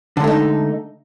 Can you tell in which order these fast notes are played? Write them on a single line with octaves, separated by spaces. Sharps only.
D3 G#3 A3 D#4